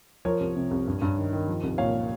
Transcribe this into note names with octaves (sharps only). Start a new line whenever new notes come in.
F3 A#4 C#5
C2
C3
C2
G2
G2
D#3
D#3
F3
C2
A#2 C#5 F5